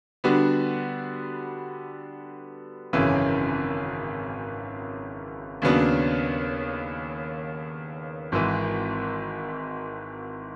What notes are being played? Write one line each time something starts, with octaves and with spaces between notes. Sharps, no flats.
D3 G3 B3 D4 F#4
G#1 F#2 C#3 E3
D#2 C#3 F#3 B3 D4
G#1 G#2 E3